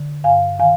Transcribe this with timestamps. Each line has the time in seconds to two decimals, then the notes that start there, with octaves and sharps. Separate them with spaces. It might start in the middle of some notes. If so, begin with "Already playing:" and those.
Already playing: D3
0.24 G2 F5 G#5
0.59 D#3 F5 G#5